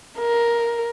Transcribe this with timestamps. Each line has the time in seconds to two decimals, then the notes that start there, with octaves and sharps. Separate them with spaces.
0.19 A#4